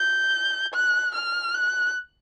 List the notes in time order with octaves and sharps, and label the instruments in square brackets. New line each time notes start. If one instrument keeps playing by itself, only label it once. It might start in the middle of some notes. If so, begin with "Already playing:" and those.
Already playing: [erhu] G6
F#6
F6
F#6